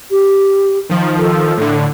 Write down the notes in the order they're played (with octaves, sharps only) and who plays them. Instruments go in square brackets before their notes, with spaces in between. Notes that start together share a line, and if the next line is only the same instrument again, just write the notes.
[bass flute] G4
[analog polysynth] D#3 F3
[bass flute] A4
[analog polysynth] A2 D3